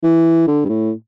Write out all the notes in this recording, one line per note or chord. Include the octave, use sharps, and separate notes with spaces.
E3
D3
G2
A2